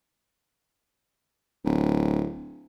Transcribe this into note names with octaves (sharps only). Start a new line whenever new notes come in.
D1